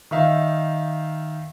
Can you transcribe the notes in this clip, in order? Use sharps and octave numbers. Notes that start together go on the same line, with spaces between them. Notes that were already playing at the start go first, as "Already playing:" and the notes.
D#3 D#4 E5 F5